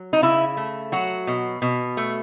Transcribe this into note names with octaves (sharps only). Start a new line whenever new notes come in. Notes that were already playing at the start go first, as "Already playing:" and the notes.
Already playing: F#3
D#4
C#3 E4
A3
F#3 F#4
B2
B2
A3